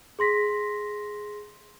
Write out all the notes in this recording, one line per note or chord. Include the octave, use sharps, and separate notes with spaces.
G#4 C6 A#6 B6